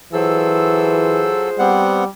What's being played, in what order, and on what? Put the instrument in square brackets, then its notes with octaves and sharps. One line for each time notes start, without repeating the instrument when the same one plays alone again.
[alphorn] E3 [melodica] F#3 A4 E6 [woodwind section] F4 G#4 C5
[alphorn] G3 [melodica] B3 C4 F#5